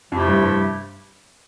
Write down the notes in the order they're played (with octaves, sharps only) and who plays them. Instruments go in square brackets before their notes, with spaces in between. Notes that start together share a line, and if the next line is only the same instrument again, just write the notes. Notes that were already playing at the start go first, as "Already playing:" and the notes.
[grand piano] F2 [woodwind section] C3 F3 A3 E4 G4
[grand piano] G2
G2